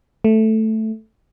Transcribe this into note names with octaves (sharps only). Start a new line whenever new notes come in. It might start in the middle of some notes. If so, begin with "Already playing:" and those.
A3